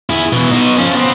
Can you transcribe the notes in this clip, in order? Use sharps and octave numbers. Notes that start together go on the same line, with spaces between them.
E4 G#4
B2 E3
B2 D#4
F3 C#4
B3 C4